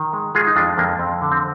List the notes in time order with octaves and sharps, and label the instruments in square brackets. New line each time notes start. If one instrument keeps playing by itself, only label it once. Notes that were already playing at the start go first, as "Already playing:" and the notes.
Already playing: [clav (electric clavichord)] D#3
G#3
G#3 F4 G#4
D#4
F2 D4 F4
F2 A#3 D4
F2 C4
D3
C4